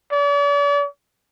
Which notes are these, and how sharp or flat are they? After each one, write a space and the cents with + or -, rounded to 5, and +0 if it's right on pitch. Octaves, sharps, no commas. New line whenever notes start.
D5 -45